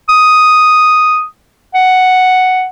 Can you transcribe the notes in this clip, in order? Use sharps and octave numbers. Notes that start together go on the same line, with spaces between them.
D#6
F#5